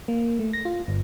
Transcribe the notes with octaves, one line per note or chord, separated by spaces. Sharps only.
A#3
A3
A#6
F4
G1